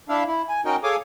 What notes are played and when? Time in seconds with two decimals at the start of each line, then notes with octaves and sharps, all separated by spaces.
0.09 D4 E4 E5 F5
0.28 E4
0.49 G#5
0.65 C#4 D#4 F#4 A#4 D#5 G5
0.83 G#4 A4 C#5 F5 G#5 D6